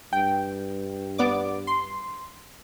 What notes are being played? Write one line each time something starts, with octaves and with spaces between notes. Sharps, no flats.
G2 G5
B3 D5 D6
C6